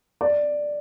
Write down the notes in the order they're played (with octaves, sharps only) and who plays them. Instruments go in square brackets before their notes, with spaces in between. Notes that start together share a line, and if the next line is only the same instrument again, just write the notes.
[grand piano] D5